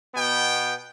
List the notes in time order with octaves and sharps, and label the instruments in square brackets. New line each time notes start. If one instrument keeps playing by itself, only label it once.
[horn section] B2 B3 G5